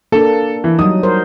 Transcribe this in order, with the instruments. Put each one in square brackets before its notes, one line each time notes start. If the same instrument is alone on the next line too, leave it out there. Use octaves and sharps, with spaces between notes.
[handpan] A#3 D4 [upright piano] A4
[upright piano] E3
[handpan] F#3 G3 D#4 [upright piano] D#6
[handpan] A#4 C5